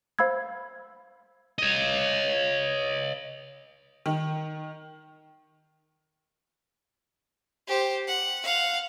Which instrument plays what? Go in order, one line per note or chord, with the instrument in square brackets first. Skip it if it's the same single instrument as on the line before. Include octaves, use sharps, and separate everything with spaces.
[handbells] C5 F5 B5 E6 G#6
[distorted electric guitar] C#5 D#5
[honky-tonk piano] D#3
[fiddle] G4 C5
F#5
F5 F#5